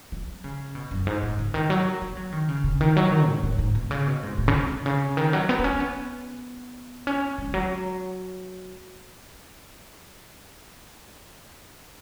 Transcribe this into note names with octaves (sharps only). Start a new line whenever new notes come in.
F#3
C#3
B2
F#2
G#2
G#2
C#3
D#3
F#3
B3
F#3
D#3
C#3
C#3
D#3
F#3
D#3
G#2
G#2
G#2
B2
C#3
B2
G#2
G#2
C#3
B2
C#3
D#3
F#3
B3
B3
C#4
B3
C#4
G#3
D#3
F#3